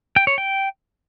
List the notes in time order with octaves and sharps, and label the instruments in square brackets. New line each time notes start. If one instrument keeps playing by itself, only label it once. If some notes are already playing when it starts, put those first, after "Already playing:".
[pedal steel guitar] G5
C#5
G5